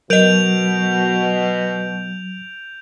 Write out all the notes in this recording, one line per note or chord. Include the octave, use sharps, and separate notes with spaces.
B2 F#3 A#4 D#5 G6 D7 F7